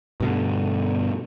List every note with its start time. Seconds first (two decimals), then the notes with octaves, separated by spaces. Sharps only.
0.20 G2 B2 D3